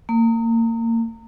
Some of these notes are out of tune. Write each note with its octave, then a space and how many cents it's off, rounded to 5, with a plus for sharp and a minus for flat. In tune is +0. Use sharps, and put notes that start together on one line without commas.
A#3 -30